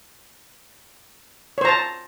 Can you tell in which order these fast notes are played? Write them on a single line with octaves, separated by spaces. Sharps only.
C#5 C5 A#5 A5